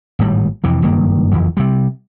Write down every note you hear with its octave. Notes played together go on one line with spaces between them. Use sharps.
G#1 A2 G3
F2 C3 E3
F#1 G2 D#3 A#3
F#1 F2 E3
C3 G3